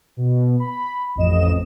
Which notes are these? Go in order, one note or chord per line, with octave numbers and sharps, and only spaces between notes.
B2
B5
A1 F2 D#5 E7